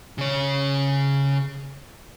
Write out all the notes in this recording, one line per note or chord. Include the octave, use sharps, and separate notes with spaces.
C#3 C#5